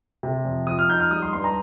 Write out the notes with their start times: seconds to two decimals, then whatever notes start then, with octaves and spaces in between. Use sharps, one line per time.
0.23 C3
0.45 F2
0.67 F3 D#6
0.79 F6
0.89 D#4 G6
1.00 F6
1.11 G3 D#6
1.22 C6
1.33 G2 C6
1.44 A#5